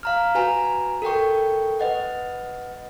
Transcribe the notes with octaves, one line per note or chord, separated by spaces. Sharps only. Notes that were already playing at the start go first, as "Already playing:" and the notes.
F5 A#5 F6
F#4 B4 G#5 A#5
A4 A#4 G5 C#6
B4 D#5 F#5